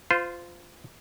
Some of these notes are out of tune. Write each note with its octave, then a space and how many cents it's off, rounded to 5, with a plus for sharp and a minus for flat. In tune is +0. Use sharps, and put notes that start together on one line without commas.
F4 +0 C5 -30